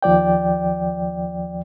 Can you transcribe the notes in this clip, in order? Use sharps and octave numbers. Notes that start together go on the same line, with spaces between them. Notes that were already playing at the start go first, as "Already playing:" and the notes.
D#2 F3 D5 G5